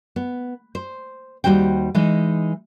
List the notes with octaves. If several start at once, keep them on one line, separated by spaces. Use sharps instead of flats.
B3
C5
D#2 C#3 G3 F#4 C5 G5
E3 G#3 D#4